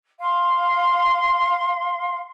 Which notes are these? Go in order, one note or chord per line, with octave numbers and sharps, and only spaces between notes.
F5 C6